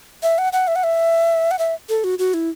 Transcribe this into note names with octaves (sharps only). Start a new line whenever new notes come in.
E5
F#5
F#5
E5
F#5
E5
F#5
E5
A4
F#4
F#4
E4